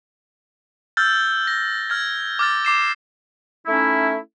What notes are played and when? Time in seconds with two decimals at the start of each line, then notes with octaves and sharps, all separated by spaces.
0.97 E6 F6 G6 A6
1.47 A#6
1.90 F6 G#6
2.39 D6 F6 A6
2.65 D6 C7 E7
3.66 A3 C#4 D#4 E4